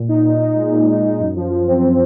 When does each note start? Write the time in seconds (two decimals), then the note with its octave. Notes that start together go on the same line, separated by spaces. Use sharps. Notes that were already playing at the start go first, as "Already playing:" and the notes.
Already playing: A#2
0.08 D#4
0.24 A#2
0.40 D#4
0.56 G#3
0.72 A#2
0.87 A#2
1.03 D#4
1.19 F#2
1.35 F3
1.51 F3
1.67 C4
1.83 C4